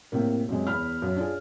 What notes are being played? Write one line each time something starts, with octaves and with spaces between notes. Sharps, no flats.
A2 C3 A#3
F#2 C3 G#3
E2 B5 F6
F#2
D4 F4 G#4